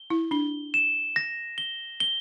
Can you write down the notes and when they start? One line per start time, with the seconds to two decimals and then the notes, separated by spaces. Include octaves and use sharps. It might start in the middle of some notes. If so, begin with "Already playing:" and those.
Already playing: G7
0.10 E4
0.31 D4 G7
0.74 E7
1.16 A#6
1.58 G7
2.00 G7